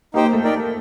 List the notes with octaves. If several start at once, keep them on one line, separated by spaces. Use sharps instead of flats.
A#3 D#4 G4 C5 G5
A#3
A3
D#4 A#4 D5 G5